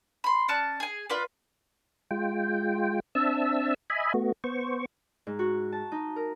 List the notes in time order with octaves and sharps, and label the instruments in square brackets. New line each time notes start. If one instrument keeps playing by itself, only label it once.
[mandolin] B5 C6
C#4 D5 A5 F#6
G#4 G#5
F4 B4 D5
[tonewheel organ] G#3 F4 G5
C4 D4 E5 A5 E6
D#5 E5 G#5 B5
A3 B3 F#4
B3 C5 C#6
[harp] G#2
F#4
A5
D#4
A#4